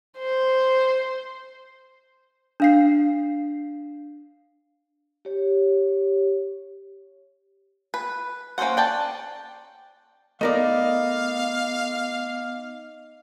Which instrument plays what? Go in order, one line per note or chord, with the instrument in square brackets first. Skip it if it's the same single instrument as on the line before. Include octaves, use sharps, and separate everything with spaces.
[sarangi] C5
[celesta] D4 F5 C7
[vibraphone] G4 C#5
[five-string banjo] B4
A#3 C#4 A4 C5 F#5
D5 G5 A5
[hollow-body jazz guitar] A3 A#4 D5 [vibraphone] B3 D#4 D6 [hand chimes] D#5 [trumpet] F5